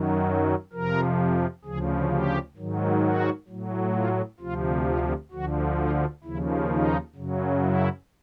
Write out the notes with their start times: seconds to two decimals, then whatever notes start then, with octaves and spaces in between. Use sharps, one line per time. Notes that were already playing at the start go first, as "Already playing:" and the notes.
Already playing: F#2 D#3 F#3
0.73 F2 C3 F3 A#4
1.65 D2 C#3 F3 G#4
2.11 G4
2.56 G#2 D#3 F#3
3.02 F#4
3.48 A2 F#3
3.95 F4
4.40 D2 C3 F3 F4
4.86 F4
5.31 D2 D3 F3 F#4
5.77 F4
6.24 D#2 C#3 F3 E4
6.69 D#4
7.15 F#2 C#3 F#3
7.61 E4